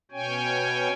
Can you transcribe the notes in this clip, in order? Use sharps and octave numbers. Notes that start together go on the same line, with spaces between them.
B2 C#4 C#5 G5 G#5